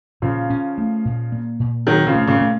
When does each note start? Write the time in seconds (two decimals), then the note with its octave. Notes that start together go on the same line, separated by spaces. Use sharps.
0.22 A#2 C#3 F3
0.50 C#4
0.78 A3
1.05 A#2
1.32 A#3
1.60 A#2
1.87 D#3 F#3 C4
2.07 C#3 F3
2.15 A3
2.27 A#2 C#3
2.41 A3